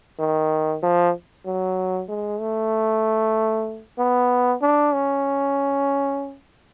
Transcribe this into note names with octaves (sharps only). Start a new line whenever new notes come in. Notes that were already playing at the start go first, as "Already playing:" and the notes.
D#3
F3
F#3
G#3
A3
B3
D4
C#4